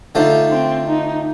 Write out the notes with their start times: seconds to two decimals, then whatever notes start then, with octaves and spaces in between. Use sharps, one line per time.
0.15 D3 A3 D4 D#4 F4 C5
0.52 C4
0.87 D#4